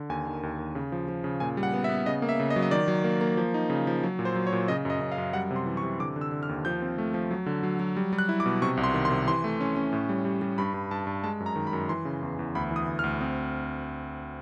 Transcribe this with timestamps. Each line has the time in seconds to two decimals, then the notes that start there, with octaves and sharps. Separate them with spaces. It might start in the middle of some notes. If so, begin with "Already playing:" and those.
Already playing: D3
0.10 D#2 G#5
0.26 D#3
0.43 D#2
0.59 D#2
0.75 C#3
0.92 F3
1.08 F3
1.24 C#3
1.40 A#2 G#5
1.57 G3
1.63 F#5
1.73 B3
1.84 E5
1.89 B3
2.06 C#3 D#5
2.22 A#3
2.29 E5
2.40 C#3
2.50 D#5
2.56 F#3
2.62 D#5
2.71 D#3 D5
2.88 F#3
3.04 A#3
3.21 A#3
3.37 F3
3.54 D#4
3.70 C#3
3.87 F3
4.03 F#3
4.19 A#2
4.25 C5
4.35 F#3
4.47 C#5
4.53 A#2
4.68 C#3 D#5
4.85 F#2 D#5
5.01 F#2
5.12 F5
5.18 F#2
5.33 G3 F#5
5.51 C3
5.56 C6
5.66 E3
5.77 C#6
5.83 C3
6.00 D3 D6
6.16 D3
6.21 E6
6.32 D3
6.43 F6
6.49 D#2
6.65 F3 G6
6.82 C4
6.98 A3
7.14 F3
7.31 F#3
7.46 D3
7.63 F#3
7.80 F#3
7.97 G3
8.13 G3
8.19 F#6
8.29 E4
8.40 D6
8.46 B2
8.62 C3 C#6
8.77 C2
8.84 C6
8.94 D#3
9.05 C6
9.11 C3
9.27 E3 C6
9.44 A3
9.60 C#4
9.76 C#4
9.93 A2
10.09 G3
10.25 G3
10.42 G3
10.58 G2 B5
10.74 G2
10.91 G2 A5
11.07 G2
11.24 G#3 A5
11.40 F#2
11.46 A#5
11.56 D#3
11.67 B5
11.73 F#2
11.89 E3 C6
12.05 C#3
12.23 E2
12.39 E2
12.55 D2 B5
12.71 E3
12.76 D#6
12.87 D2
12.99 D2 F6
13.21 C4